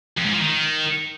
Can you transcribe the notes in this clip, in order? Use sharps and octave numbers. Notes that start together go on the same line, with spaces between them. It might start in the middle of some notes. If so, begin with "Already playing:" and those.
F2
G#2
F3
D#3